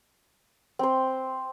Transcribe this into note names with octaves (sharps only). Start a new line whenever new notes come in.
C4 C5